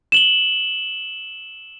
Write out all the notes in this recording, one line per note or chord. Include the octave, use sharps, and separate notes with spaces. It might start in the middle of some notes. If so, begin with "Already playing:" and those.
E7 F#7 G7